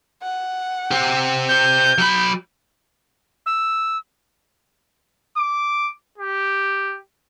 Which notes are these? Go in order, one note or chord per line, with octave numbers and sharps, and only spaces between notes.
F#5
G4 C5
G6
F#3 B5
E6
D6
G4